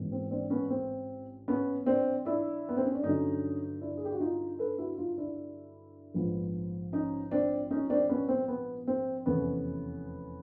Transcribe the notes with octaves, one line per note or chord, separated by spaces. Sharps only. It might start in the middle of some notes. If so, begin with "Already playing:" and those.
Already playing: A1 G#2 E3 G#3 B3
C4
C4 D4
B3 C#4
C4
B3 C#4
C4 D4
D4 E4
B3
C4
C#4
D4
G2 D3 F#3 C#4 D#4
D4 E4
G#4
G4
F#4
D#4 F4
A4 B4
E4 F#4
D#4 F4
D4 E4
A#1 G#2 F3 G#3 B3
C#4 D#4
C4 D4
C#4 D#4
C4 D4
B3 C#4
C4
B3
C4
F1 E2 C3 E3 A3 B3 C#4